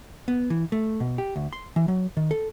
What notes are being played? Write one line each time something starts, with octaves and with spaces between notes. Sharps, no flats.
B3
E3
A3
B2
G4
D2
C6
E3
F#3
D#3
A4